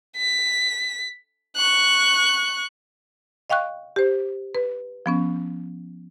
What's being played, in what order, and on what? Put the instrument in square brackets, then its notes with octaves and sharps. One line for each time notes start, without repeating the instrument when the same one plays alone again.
[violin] B6
C#6 F#6
[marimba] D#5 F5 G5 C#6 F#6
G4 C5
B4
F3 B3 C#4